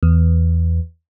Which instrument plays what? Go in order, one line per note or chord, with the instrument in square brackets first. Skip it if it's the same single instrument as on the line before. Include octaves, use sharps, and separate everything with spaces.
[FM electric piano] E2